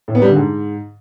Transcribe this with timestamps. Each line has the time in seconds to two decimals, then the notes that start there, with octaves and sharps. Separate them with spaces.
0.08 A2
0.15 B3
0.22 G3
0.29 D3
0.36 G#2